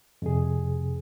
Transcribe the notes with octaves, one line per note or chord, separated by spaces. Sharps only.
F2 C3 G#4